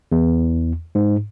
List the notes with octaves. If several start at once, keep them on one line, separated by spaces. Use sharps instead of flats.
E2
G#2